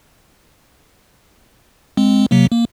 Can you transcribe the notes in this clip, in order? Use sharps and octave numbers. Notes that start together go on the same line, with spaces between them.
G#3 C4
C3 F#3 A#3
A#3